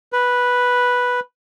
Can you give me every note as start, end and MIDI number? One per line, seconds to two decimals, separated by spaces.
0.13 1.20 71